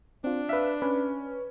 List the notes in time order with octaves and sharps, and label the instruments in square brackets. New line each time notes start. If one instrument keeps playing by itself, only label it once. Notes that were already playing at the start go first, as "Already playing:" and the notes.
[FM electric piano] C4 F4 [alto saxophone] D4
[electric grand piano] B4 E5 [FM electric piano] F5
[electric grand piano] C#4 [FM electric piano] B4